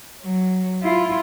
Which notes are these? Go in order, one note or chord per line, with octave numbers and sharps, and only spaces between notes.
F#3
E4 F4